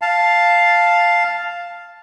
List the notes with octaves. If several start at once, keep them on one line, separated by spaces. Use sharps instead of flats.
F5 A5